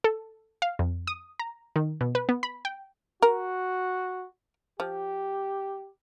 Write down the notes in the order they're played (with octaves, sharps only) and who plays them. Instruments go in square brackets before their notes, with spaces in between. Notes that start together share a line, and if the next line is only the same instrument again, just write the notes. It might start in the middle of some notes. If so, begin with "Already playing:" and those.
[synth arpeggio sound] A4
F5
F2
D#6
A#5
D#3
B2
B4
B3
B5
G5
[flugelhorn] F#4 [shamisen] A#4
[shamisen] F3 [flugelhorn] G4